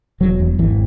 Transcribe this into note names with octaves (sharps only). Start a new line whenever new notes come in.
E1 F#3
E2
G#1 E3